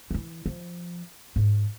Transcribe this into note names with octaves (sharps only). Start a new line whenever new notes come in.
E3 E4
F3
G#2